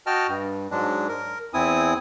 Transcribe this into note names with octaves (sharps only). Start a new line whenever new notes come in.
F#4 D#5 G5 A5 F6
G2
G#2 F#3 G#3 D4
A#4
E2 C4 E4 G#5 D#6